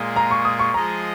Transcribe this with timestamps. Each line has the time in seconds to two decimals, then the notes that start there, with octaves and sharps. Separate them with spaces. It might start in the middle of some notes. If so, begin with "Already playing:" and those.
Already playing: A#2 G#3 F4 G#4
0.16 A#5
0.31 C#6
0.45 D#6
0.59 C#6
0.74 F3 G#3 F4 G#4 D#5 A#5